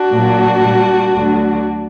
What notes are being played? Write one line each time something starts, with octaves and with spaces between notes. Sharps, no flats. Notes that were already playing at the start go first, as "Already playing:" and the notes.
Already playing: D4 F#4
A#2 F#3
A#2 G3
D2 D3 F#3